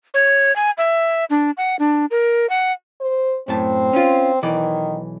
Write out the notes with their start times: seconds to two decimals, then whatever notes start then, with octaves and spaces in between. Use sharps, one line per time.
0.14 C#5
0.56 G#5
0.78 E5
1.30 D4
1.57 F#5
1.79 D4
2.11 A#4
2.49 F#5
3.00 C5
3.48 F#2 A2 C4 A5
3.93 C#4 F4
4.43 B1 D#3 E3 D5